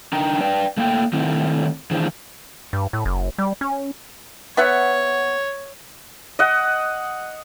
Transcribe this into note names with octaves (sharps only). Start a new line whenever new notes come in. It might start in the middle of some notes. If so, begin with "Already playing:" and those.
D4 D#4 A#4 G5 A#5
B4 D5 G5
A3 A#3 F5 G5
D#3 A3 C4 E4
D#3 E3 D4 E4 G#4 C5
G2
A2
F#1
G3
C#4
B3 C#5 E5 F#5
D#5 F#5